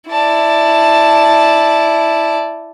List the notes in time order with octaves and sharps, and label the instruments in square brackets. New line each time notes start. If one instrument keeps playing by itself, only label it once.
[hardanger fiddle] E4 [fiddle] D5 A5